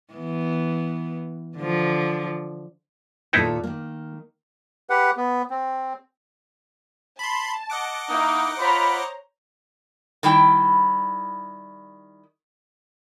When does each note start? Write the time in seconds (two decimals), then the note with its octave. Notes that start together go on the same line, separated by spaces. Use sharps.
0.14 E3 B3
1.57 D3 F3
3.33 D#2 A#2 B3 D#4 E4 A4
3.64 D#3 A#3
4.90 G4 B4 F#5
5.17 B3
5.50 C4
7.19 A5 B5 C6
7.70 D#5 F#5 D6
8.09 A#3 D#4 E4 D#6
8.58 F4 C5 C#5 A#5 B5
10.23 D#3 G3 E4 G5